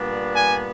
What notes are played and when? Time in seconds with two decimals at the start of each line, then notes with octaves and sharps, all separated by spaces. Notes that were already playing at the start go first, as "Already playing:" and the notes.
Already playing: A#2 G3 B3 D4
0.33 G#5